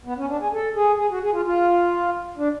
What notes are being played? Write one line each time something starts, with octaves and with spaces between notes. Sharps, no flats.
B3
C#4
D4
G#4
A4
G#4
G#4
F#4
G#4
F4
F4
D4